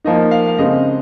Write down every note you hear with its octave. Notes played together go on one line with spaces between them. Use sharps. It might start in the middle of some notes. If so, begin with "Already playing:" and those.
F3 A#3 D#4 D#5
F5
F5
C#3 G#3 C4 D#5